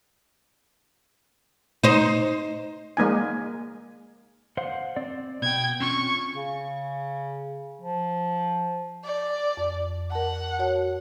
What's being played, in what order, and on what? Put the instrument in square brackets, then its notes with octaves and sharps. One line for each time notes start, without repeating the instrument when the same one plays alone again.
[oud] D#4 C5
[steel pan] G#3 A#3 D#4 G#5
[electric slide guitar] C5 F5 F#5
C4 D5
[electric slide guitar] B2 B3 [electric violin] G5 G#6
[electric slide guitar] C4 C#4 F4 [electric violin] C#6
[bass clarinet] C#3
F3
[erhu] D5
[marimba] F2
[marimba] A#4 A5 [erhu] F#5
[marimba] F#4 C#5 A5